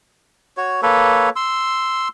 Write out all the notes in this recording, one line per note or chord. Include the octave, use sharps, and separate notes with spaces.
F#4 C#5
A#3 A4 B4 C#5
C6 E6